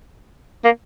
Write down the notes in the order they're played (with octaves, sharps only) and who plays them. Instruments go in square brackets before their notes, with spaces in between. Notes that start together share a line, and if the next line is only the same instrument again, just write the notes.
[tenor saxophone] A#3